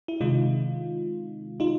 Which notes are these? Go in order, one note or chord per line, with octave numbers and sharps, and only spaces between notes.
E4
C3 D#3 G#3 D#4 F4
D#4 F4